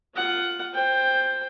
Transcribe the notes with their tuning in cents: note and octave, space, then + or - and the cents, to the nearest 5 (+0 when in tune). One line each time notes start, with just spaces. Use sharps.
F4 +0 F#5 +15
C5 +0 G5 +15